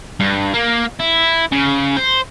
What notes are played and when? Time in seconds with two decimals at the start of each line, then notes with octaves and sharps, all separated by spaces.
0.20 G2
0.54 A#3
1.00 E4
1.52 C#3
1.97 C5